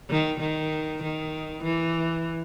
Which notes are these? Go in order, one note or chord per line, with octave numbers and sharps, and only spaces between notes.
D#3
D#3
D#3
E3